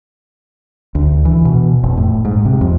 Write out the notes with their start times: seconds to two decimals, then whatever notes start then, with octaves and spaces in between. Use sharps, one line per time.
0.95 D2
1.25 E3
1.45 B2
1.84 F1
1.97 A2
2.25 G#2
2.45 C3
2.61 F2